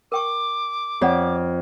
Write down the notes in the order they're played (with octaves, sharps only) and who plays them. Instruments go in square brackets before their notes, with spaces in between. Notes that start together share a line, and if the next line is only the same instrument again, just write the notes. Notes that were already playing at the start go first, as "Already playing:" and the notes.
[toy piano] A#4 G5 C#6 [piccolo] D6
[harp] F2 [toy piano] C#5 D5 F#5